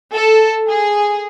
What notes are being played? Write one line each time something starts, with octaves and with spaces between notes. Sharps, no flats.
A4
G#4